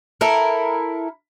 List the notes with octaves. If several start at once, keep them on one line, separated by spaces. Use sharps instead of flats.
E4 A4 A#4